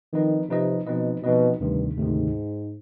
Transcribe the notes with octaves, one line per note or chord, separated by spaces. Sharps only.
D#3 F3 C4 D#4 B4 D#5
C3 F3 C4 D#4 B4 D#5
B2 F3 C4 D#4 B4 D#5
B2 F3 C4 D#4 B4 D#5
D2 G2 C3 D#3
D2 G#2 C3 D#3